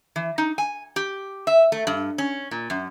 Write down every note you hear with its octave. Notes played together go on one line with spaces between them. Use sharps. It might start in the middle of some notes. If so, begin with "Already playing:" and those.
E3
D#4
G#5
G4
E5
A3
G2
C#4
A#2
F#2